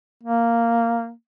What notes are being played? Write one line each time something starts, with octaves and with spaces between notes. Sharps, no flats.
A#3